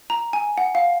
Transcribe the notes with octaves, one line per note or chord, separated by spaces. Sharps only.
A#5
G#5
F#5
F5